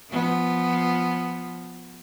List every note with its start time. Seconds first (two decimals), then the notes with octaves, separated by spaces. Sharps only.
0.10 F3 B3